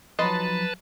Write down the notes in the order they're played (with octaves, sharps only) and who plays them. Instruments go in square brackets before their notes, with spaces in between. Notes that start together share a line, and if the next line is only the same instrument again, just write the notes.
[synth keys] F3 F#3 [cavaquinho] D#4 B5 C6 [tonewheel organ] B4 A5 [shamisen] D#5